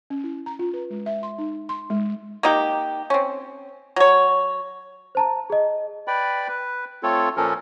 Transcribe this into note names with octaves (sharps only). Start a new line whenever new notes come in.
C#4
E4
A#5
F4
B4
G#3
E5
C6
D#4
C6
G#3
A#3 D#4 G4
C4 C#4
F#3 C#5
C5 A5 A#5
G#4 D#5
B4 D5 G5 B5
B4
A3 C4 F4 A4 C#5
A#2 F3 C#4 A4 A#4